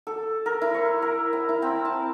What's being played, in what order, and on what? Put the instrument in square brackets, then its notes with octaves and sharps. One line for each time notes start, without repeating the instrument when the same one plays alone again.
[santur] A4
A#4
E4
C#6
A#4
G#5
E4
C4
A5